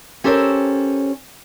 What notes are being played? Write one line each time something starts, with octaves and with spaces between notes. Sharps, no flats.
C#4 G4 A4 A#4 C5 C#5